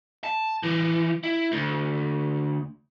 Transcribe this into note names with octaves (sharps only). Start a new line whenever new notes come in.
A5
E3
E4
D2